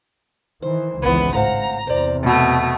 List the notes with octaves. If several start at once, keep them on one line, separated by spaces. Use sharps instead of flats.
D#3 E3 C5
G#1 C#2 E3 B3
A2 C5 F5 F#5 A#5
E2 C3 C4 C5 D5
B2 A3 E4